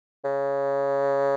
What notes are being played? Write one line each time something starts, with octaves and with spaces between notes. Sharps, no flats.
C#3